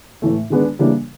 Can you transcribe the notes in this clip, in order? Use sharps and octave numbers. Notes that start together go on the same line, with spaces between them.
A2 E3 A3
D#3 G#3 B3 D4
C#3 E3 G3 A#3 D4